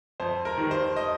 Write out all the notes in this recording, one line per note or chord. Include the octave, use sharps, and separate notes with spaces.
F2 C5
A#4
D#3 G3
C5
D#5